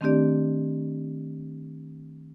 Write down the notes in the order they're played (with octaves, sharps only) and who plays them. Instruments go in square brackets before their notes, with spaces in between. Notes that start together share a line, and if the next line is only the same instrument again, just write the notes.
[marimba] D#3 A3 C4 D4 G4 D5